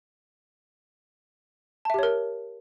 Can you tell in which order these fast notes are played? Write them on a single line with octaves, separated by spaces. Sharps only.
A5 E5 G4 C#5 A#4